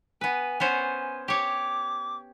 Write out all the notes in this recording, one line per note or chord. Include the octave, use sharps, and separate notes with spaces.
B3 B4 G#5
B3 C#4 C5
G4 C#5 D6